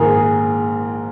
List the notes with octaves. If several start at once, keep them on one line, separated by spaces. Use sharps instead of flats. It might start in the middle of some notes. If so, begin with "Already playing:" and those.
Already playing: A#1 G#2 D#3 G#4 A#4
G#4